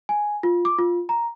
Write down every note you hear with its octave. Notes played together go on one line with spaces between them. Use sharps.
G#5
F4
D6
F4
A#5